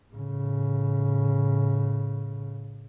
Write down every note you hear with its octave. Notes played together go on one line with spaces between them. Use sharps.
A2 C#3